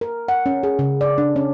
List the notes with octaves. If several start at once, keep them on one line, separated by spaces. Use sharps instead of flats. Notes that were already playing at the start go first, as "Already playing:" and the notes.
A#4
F#5
C#4
G#4
C#3
D5
D4
C#4